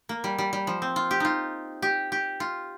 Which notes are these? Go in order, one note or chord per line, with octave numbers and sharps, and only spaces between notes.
A#3
G3
G3
G3
F3
C4
F4
G4
D#4 F4
G4
G4
F4